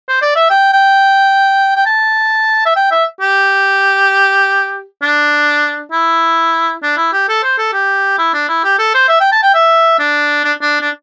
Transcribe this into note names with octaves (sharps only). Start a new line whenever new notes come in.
C5
D5
E5
G5
G5
G5
A5
E5
G5
E5
G4
D4
E4
D4
E4
G4
A4
C5
A4
G4
E4
D4
E4
G4
A4
C5
E5
G5
A5
G5
E5
D4
D4
D4
D4